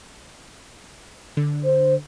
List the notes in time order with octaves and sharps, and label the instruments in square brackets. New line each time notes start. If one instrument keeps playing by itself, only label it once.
[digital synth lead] D3
[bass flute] C5